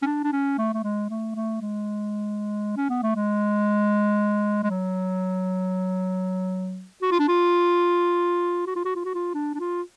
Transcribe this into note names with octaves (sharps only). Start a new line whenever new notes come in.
C#4
D4
D4
C#4
A3
A3
G#3
A3
A3
G#3
C#4
B3
A3
G#3
G#3
F#3
F#4
F4
D4
F4
F#4
F4
F#4
F4
F#4
F4
D4
D4
F4